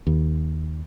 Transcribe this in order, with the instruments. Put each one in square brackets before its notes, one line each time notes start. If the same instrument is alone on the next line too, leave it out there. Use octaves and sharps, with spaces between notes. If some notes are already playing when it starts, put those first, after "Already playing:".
[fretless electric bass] D#2